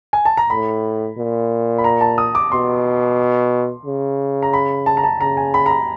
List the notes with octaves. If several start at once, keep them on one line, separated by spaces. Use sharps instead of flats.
G#5
A5
A#5
A2 B5
A#2
B5
A#5
A5
D#6
D6
B2 C6
C#3
A#5
B5
A5
A#5
A5
C#3 A#5
G#5
B5
A#5
B5